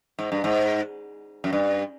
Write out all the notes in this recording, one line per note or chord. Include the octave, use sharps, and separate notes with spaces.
G#2
G2
G#2
F#2
G2